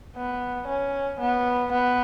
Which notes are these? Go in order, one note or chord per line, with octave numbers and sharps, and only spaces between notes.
B3
C#4
B3
B3